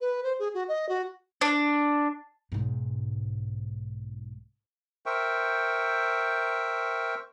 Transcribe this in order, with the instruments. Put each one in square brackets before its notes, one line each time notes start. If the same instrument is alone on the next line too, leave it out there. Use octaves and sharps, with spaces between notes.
[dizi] B4
C5
G#4
F#4
D#5
F#4
[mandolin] D4
[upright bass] B1 G#2
[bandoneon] A#4 C5 E5 G5 C#6